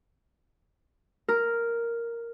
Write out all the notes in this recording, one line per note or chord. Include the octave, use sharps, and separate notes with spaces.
A#4